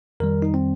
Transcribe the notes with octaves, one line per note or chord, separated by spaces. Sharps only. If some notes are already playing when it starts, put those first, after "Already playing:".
F2 D#3 G3 A#4
D#4
C4